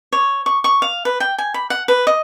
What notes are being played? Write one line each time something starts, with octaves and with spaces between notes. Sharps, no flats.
C#5
C#6
C#6
F5
B4
G5
G#5
B5
F#5
B4
D#5